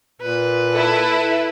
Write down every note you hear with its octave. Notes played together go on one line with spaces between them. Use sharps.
A#2 B4
E4 A4